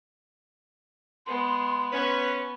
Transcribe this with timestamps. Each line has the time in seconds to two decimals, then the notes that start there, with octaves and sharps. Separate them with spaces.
1.26 G#3 B3 C6
1.93 B3 C#4 B4 C6